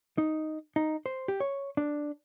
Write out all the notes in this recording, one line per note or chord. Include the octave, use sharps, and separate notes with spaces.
D#4
D#4
C5
G4
C#5
D4